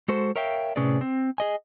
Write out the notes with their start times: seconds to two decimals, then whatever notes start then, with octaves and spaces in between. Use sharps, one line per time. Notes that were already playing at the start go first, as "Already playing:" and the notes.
0.08 G#3 F#4 A4 C5
0.36 A#4 C#5 E5 F5 G5
0.76 A2 C3 C#4 G#4 B4 D5
1.01 C4
1.38 G#4 D#5 G#5